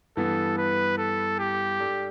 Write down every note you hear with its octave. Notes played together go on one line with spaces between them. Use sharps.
G2 E3 B3 A4
B4
A4
G4
G3 D4 A4